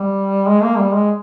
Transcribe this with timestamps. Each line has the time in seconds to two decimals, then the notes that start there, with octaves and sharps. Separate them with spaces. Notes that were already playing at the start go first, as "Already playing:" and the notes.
Already playing: G3
0.47 G#3
0.63 A#3
0.78 G3
0.94 G#3